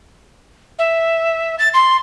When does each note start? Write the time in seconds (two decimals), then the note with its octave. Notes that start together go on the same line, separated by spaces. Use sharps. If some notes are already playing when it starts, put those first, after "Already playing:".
0.78 E5
1.59 A6
1.74 C6